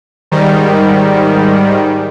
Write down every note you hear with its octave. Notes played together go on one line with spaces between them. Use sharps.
G#2 D#3 G3